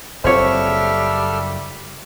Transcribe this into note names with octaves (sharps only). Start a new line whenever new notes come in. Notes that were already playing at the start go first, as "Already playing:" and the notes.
F#1 G3 C4 A4 C#5 E5 F6